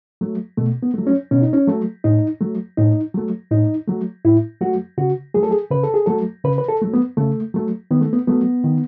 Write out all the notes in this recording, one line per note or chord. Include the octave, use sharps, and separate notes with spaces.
F#3 A3
B2 A3
B3
F#3 A3
C#4
B2 C#4
D#4
C#4
F#3 A3
A2 D#4
F#3 A3
A2 D#4
F#3 A3
A2 D#4
F#3 A3
A2 E4
F#3 A3 F#4
C#3 F#4
F#3 A3 G#4
A4
G#4
C#3 B4
A4
G#4
F#3 A3 A4
C#3 B4
B4
A4
F#3 A3
B3
C#3 A3
F#3 A3
D#3 B3
A3
B3
F#3 A3 B3
D#3